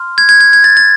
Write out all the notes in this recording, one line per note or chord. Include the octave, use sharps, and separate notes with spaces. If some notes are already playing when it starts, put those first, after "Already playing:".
Already playing: C6 F6
G#6
G#6
G#6
G#6
A6
A6